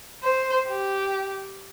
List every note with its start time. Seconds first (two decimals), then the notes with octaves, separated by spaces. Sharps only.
0.23 C5
0.68 G4